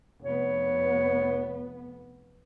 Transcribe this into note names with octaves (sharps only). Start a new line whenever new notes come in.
F1 B3 C#5